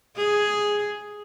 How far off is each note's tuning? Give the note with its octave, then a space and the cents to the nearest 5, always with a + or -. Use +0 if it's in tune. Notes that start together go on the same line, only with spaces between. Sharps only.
G#4 +0